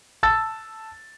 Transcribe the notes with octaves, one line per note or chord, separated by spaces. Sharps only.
A5 E6 A6